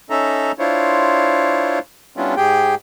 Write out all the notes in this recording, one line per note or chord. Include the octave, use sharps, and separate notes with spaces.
C#4 D#4 A4 E5 A#5
D4 E4 F4 C5 C#5
G3 B3 C#4 D4 E4 F4
G#2 G4 G#4 G5